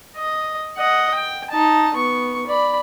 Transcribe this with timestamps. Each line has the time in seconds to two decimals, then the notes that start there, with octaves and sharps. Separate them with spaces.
0.17 D#5
0.77 D#5 F#5
1.14 G5
1.50 D#4 A5
1.95 B3 C#6
2.47 D5 B5